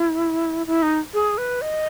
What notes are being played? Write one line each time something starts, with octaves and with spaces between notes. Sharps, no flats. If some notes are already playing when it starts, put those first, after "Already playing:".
Already playing: E4
E4
D#4
G#4
B4
D#5